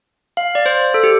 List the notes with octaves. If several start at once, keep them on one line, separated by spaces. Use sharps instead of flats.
F5
D5
C5
A4
G4